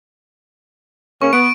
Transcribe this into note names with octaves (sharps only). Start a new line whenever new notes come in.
C#3 A#3 C#4 C#6
B3 D7